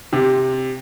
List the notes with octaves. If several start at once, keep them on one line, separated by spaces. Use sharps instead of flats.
C3